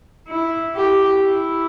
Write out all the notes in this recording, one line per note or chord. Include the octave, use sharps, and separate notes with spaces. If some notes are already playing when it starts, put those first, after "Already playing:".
E4
G4
E4